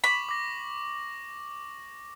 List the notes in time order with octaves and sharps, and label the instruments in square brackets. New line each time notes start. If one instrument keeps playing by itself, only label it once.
[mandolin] B5 [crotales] C#6 D6 F#7
[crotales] D6 A#6